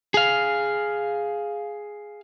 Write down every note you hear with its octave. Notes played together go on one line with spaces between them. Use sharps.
G#4 F5